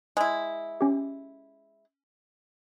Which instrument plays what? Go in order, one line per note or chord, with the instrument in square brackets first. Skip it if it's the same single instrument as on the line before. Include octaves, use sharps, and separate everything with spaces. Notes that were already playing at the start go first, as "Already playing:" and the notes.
[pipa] G#3 E4
[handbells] C#4 G4